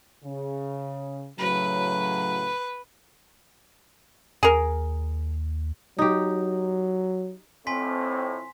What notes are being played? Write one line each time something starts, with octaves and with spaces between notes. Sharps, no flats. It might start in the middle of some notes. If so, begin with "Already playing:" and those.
C#3
A2 C#3 F#3 B4
D#2 G#4 A#4
F#3 D#4 G4
F2 A2 C4 G#5 C6 B6